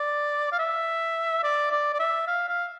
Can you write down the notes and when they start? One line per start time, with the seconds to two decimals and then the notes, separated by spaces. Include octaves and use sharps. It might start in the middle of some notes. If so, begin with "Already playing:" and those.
Already playing: D5
0.52 F5
0.59 E5
1.44 D5
1.72 D5
1.93 D5
1.99 E5
2.27 F5
2.48 F5